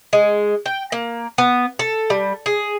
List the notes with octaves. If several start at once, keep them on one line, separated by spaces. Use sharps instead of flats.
G#3
G5
A#3
B3
A4
G3
G#4